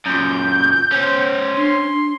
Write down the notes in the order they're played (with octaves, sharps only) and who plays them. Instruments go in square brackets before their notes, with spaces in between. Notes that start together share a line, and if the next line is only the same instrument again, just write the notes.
[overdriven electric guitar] F#2 A#2 [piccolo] G6
[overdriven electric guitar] C#4 C5
[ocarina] D4 [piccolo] C6